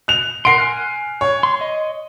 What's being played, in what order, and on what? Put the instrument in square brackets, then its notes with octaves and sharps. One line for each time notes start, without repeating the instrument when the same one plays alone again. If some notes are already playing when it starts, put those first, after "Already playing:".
[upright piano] F#6 F7
[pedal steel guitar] A#4 F#5 C6 [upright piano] C7 D7
[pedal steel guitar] G#5 F6 F#6
[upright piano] C#5
[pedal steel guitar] C6
D#5